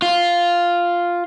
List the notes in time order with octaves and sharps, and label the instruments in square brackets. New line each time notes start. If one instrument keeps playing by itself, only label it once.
[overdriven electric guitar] F4